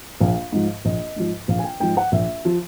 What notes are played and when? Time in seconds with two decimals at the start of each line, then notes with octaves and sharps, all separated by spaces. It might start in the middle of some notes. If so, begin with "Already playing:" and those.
0.21 A#1 F5
0.53 G#2 F3
0.85 A#1 D#5
1.16 G#2 F3
1.48 A#1 F5
1.59 G#5
1.64 G5
1.80 G#2 F3 G5
1.97 F#5
2.12 A#1 E5
2.45 F3